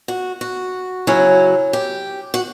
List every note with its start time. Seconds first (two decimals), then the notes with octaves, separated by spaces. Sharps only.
0.08 F#4
0.41 F#4
1.07 C#3 F#3 C#4 E4
1.73 G4
2.34 F#4